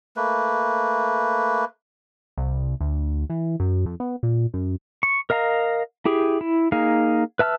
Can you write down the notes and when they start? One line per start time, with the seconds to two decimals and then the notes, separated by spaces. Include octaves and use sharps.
0.16 A3 A#3 B4
2.38 C2
2.81 D2
3.30 E3
3.60 F#2
3.86 F2
4.00 B3
4.23 A#2
4.54 F#2
5.03 C#6
5.30 A#4 D#5 F5 A#5
6.05 E4 G4 G#4
6.41 E4
6.72 A#3 D#4 G#4 F5
7.39 B4 E5 A5 E6 F6